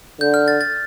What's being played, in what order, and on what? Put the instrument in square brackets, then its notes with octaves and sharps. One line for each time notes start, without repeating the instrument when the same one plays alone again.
[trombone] D3 [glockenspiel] G6
[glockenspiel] F6
A6
A6